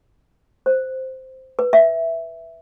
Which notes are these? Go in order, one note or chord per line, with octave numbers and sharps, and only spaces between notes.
C5
B4
E5